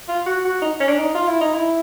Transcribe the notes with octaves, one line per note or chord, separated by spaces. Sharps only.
F4
F#4
F#4
D#4
C#4
D4
D#4
F4
E4
D#4
E4